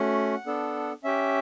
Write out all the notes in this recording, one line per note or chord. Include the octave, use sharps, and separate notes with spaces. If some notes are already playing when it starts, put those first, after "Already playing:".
Already playing: A3 C#4 F#4 F#5
B3 D4 A4
C#4 G4 E5